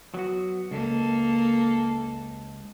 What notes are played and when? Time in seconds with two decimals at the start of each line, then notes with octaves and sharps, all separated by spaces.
0.14 F#3 B3 F#4
0.71 C#2 A#3 A4